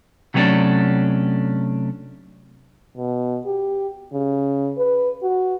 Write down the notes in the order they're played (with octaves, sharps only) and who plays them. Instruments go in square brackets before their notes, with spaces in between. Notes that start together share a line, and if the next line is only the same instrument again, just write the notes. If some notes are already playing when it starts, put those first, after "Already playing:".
[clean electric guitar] C3 F#3 A3 B3 C#4 D4
[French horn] B2
G4
C#3
B4
F#4